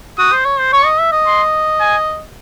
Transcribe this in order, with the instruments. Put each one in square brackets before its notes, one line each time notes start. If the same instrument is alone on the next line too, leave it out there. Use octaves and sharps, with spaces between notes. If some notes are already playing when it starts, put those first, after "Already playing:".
[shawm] F#4 [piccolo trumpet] D#6
[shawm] C5
C#5
C5
[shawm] C#5 [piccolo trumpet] C#6
[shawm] D#5
E5
D#5
[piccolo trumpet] C6
G#5